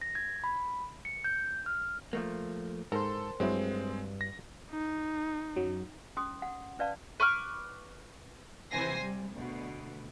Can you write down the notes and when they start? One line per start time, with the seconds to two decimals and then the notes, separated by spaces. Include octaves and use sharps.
0.01 A#6
0.15 G#6
0.44 B5
1.05 C#7
1.24 G6
1.66 F6
2.13 F3 A3 A#3
2.92 G#2 A4 A#4 C5
3.40 G2 F#3 G#3 C4 E4
4.21 A#6
4.70 D#4
5.56 F#2 F#3
6.17 C#4 C6 D#6
6.42 F#5
6.79 C#4 B4 D5 F5 A5
7.20 B4 C#6 D6 F6
8.71 C3 E3 C5 G#5 A#6 C7
9.00 G3
9.32 D2 B2